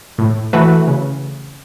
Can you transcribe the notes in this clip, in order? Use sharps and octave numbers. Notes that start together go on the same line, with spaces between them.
A2
E3 A3 F#4 B4
C#3